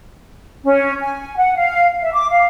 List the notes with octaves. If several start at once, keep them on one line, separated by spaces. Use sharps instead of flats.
C#4
G#5
F#5
F5
E5
D6
F5